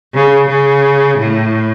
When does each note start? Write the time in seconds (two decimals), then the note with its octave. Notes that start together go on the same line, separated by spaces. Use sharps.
0.14 C#3
0.48 C#3
1.18 A2